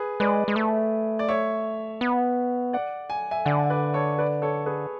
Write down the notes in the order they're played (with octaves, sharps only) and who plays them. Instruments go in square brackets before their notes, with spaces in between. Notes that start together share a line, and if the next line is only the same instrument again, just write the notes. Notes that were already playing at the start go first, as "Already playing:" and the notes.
Already playing: [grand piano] G#4 B4
[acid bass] G#3 [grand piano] B4 D5
[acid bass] G#3
A3
[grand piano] D5
C#5 E5
[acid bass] B3
[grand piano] D5 F#5
G#5
E5 G#5
[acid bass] D3 [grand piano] D5 F#5
[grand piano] B4 D5
A4 C#5
B4 D5
A4 C#5
G#4 B4